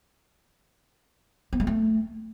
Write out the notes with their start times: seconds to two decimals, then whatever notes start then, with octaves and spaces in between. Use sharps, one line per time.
1.53 B3
1.60 G#3
1.67 A3